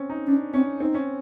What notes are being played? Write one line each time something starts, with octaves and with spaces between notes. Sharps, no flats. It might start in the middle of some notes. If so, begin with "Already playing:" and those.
Already playing: C4 C#4
D#4
C#4 D4
C4 C#4
C4 D#4
C#4